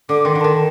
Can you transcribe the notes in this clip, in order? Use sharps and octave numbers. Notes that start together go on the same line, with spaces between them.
D3 D6
D#3 C6
D3
D#3 A5